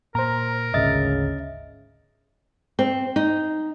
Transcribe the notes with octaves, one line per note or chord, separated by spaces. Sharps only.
A#2 A#4 C5 A#5
G#1 D2 G#2 C#3 D#5 E5 A6
C4
D#4